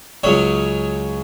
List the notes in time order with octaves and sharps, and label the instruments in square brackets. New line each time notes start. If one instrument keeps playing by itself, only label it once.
[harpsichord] C#2 C#3 F#3 C#5